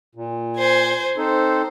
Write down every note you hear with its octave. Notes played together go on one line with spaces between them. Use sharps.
A#2
C5 G#5
C4 D#4 A4 C5